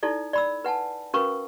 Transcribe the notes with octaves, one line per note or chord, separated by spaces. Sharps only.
D#4 E4 A4 D5
D5 B5 E6
B4 F#5 G#5 A5
C#4 F#4 A#4 B4 F5 C#6